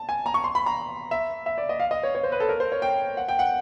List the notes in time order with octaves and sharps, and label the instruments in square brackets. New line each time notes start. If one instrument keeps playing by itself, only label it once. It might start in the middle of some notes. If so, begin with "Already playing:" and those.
Already playing: [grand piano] A5
G#5
A#5
C#6
C6
B5
A#5
E5
E5
D5
D#5
F5
D#5
C#5
C#5
C5
B4
A4
A#4
C5
C#5
G5
F#5
G5
F#5